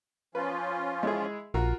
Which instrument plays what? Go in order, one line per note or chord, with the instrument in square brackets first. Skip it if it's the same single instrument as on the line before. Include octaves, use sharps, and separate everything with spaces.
[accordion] F3 C#4 F4 [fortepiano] B4
[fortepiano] G#3 E4 G#4
[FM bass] A#1 [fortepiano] F4 F#4 A#4